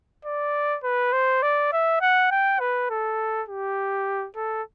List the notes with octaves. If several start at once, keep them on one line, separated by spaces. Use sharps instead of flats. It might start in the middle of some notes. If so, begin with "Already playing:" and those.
D5
B4
C5
D5
E5
F#5
G5
B4
A4
G4
A4